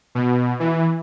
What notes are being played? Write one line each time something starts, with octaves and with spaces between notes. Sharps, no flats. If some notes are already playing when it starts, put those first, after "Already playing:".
B2
E3